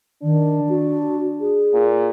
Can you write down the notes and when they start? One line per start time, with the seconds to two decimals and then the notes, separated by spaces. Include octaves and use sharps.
0.23 D#3 D4
0.69 F#4
1.41 G#4
1.74 A#2